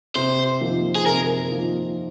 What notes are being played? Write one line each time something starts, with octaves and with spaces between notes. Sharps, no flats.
C3 C5
F3 A#3 D#4
G#4
C3 A#4
F3 A#3 D#4